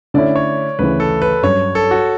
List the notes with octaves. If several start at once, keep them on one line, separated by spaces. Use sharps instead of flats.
D3 A3 C#4 E4 D5
C#5
D2 C#3 E3 B4
A4
B4
G2 F#3 C#4 C#5
A4
F#4